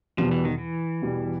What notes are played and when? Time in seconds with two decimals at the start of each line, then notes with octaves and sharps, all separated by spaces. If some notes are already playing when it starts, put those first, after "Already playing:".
0.17 E2 B2 F3 G3
0.31 E3
0.45 D#3
0.58 E3
1.02 E2 B2 G3